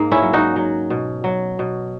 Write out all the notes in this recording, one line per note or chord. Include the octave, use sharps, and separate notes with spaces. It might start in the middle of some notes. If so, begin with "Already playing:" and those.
Already playing: G#2 A#3
C#4 E4
F#3
D#4 F#4
F#3
B2
F#3
B2